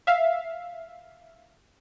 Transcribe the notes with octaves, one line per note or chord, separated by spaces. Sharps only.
E5 F5